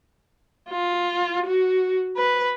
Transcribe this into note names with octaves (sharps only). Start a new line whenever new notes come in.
F4
F#4
B4